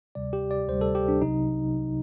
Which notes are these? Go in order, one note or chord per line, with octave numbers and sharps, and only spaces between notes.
D2 C3 G3 D5
G4
D5
D2 C3 G3 C5
A4
G4
D4
C2 C3 F#3 D#4